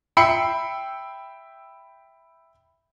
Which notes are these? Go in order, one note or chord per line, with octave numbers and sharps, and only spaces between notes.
E5 G5 B5 E6 C7 C#7